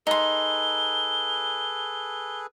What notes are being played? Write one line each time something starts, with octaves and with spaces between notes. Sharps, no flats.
D#4 G#4 A4 B4 C6 G7